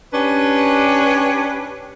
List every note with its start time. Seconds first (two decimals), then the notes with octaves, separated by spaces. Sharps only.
0.14 C#4 D4 G4 B4